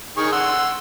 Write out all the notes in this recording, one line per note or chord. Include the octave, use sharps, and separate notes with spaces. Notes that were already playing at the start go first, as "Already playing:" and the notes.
D#3 G#4 C#6
F#5 C6 E6